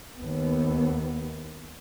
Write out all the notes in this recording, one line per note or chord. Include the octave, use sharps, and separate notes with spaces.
D#2 B3